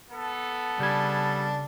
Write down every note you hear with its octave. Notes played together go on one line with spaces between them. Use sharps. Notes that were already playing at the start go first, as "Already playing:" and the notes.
B3 A4
C#3 G3 D4 G#5